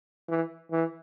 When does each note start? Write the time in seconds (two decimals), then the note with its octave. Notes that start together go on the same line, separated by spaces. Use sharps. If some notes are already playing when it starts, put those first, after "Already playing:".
0.29 E3
0.72 E3